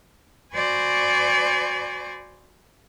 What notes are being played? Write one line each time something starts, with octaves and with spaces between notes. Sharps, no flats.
F#4 C5 D5 G#5 B5 C#6